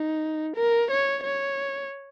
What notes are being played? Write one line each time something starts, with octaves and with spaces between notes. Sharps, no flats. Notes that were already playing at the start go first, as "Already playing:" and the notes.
Already playing: D#4
A#4
C#5
C#5